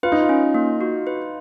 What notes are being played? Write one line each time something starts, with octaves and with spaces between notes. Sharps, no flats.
F4 B4
D#4
F4
C#4
A#3
F#4
B4